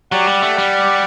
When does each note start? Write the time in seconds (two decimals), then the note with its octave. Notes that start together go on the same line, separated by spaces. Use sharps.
0.11 F#3 G4 D5 F#5
0.27 G3
0.42 A3
0.58 G3